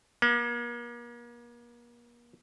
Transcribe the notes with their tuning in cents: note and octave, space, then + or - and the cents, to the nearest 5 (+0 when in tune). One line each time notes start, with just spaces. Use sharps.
A#3 +40